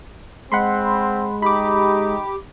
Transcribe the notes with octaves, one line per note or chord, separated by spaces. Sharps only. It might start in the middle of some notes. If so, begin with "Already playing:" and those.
G#3 C4 F#5 B5 C6
D#4 G4 B5 D6